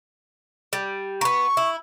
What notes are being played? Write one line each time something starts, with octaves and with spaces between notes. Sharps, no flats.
G3
A#3 B3 C#6
E4